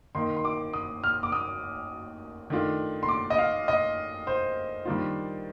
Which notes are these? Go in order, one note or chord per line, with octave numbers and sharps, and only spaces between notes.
D#3 A#3 D#4 C6
C6
D6
D#6
F6
D6
D#6
D#3 A3 D4 F4
C6
D6
D#5
F5
D#5
C5
D#3 G3 A#3 D4 F4